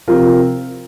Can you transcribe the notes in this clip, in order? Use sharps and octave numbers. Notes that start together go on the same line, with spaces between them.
C3 F3 C4 F4 A#4